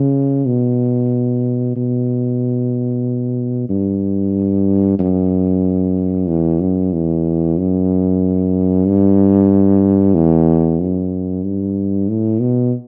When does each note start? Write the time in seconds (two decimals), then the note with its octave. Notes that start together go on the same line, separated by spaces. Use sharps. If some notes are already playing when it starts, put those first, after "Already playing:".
Already playing: C#3
0.47 B2
1.76 B2
3.69 G2
4.99 F#2
6.27 E2
6.61 F#2
6.93 E2
7.57 F#2
8.86 G2
10.15 E2
10.80 F#2
11.44 G2
12.09 A2
12.40 B2